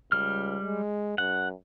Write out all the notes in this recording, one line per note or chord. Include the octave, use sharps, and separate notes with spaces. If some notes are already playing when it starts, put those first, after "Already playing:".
C#2 G3 F6
G#3
F#2 F#5